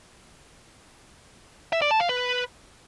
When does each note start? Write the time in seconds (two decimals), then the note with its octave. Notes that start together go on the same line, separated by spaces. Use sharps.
1.73 E5
1.82 D5
1.91 A5
2.00 F5
2.09 B4